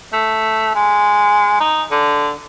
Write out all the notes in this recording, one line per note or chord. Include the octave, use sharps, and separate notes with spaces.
A3
G#3
D#4
D3